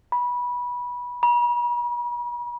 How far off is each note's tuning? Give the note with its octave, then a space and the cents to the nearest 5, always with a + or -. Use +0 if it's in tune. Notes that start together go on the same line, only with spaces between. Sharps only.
B5 -20
B5 -45